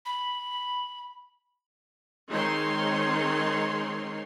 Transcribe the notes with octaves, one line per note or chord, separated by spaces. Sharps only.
B5
D#3 G#3 C4 D#4 C#5 C6